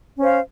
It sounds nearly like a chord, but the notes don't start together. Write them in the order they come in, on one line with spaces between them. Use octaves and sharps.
C#4 C5 F5